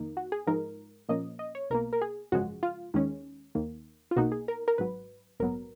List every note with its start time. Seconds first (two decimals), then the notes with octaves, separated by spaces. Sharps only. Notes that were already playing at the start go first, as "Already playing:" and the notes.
Already playing: F2 D#3 A#3 D#4
0.17 F#4
0.32 G#4
0.47 G#2 F3 G#3 D#4 A#4
1.09 A#2 F3 A#3 C#4 D#5
1.39 D#5
1.55 C#5
1.70 B1 B2 A#3 A#4
1.93 A#4
2.02 G#4
2.32 G#1 F#2 C#3 F3 G#3 F#4
2.63 F4
2.94 D#2 D#3 G#3 C#4
3.55 D#2 D#3 A#3
4.11 F4
4.16 B1 B2 A#3 D#4 F#4
4.32 G#4
4.48 A#4
4.68 A#4
4.78 G#1 G#2 F#3 B4
5.40 A#1 G#2 F#3 B3 A#4